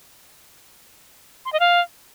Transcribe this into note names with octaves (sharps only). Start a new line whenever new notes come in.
C6
D#5
F5